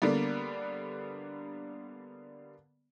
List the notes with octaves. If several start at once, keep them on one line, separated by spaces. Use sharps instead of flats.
D3 G3 A#3 B3